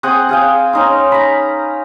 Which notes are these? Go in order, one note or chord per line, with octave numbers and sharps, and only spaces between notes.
C4 G#4 F#5 D#6
G#4 F5 G5
C#4 D#4 C6
A#5 B5